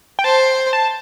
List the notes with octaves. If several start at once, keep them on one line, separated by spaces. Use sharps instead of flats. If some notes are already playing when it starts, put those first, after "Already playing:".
G5
C5 A5
A5